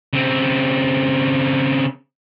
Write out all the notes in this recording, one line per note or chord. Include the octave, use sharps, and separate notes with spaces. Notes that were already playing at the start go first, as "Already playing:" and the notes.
C#3 C4